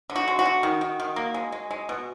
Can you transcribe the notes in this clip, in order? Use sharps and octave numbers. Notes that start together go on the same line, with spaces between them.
D3
F#4
G#3
F#4
D3
D#3
D#3
D#3
A#3
G#3
G#3
G#3
B2